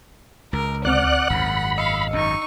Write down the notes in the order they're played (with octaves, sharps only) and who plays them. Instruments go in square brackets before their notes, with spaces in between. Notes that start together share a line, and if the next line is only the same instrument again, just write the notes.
[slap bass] C#2 [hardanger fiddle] A#4
[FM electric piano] D2 C4 F6 [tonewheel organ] D5 F#6 [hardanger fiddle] F#5
[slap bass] G#1 F#2 [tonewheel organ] B5
[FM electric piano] D#5 E6 C#7 [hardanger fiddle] F5
[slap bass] G#1 F#2 [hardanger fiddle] D#4 C#6